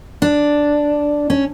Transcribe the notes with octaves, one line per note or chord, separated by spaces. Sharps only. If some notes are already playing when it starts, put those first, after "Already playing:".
D4
C#4